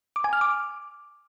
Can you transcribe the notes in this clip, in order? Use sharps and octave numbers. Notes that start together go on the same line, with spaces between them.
D6
G#5
F6
D6